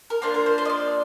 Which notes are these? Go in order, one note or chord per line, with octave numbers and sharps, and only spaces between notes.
A#4
A#3 D4 F4 C5
A#4
C5
C5
D#5
D5